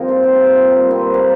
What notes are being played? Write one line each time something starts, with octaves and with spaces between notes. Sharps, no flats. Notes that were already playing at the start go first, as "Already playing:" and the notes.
Already playing: G2 F3 A#3 C4 D#4 A#4 F5
F4
G4
G4
F4
G2 G3 A#3 D#4
C4
A#3